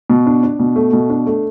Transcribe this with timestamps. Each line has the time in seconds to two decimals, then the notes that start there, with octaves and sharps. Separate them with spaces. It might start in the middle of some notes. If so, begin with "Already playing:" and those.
0.10 B2
0.26 D4
0.43 D4
0.59 B2
0.76 A3
0.93 B2
1.10 D4
1.27 A3